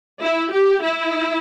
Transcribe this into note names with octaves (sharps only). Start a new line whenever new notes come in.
E4
G4
E4